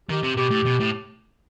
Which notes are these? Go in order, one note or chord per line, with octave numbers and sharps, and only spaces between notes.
D#3 G4
C3
B2 G4
A2
B2
A2